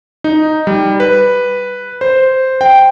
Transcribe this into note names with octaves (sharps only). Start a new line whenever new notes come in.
D#4
G3
B4
C5
G5